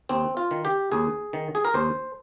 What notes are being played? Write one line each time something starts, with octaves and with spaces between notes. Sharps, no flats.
D#2 C4
F4
D#3
G4
D#2 G#4
D#3
G#4
A#4
D#2 C5